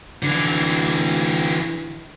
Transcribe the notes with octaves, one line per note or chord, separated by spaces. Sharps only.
D3 E3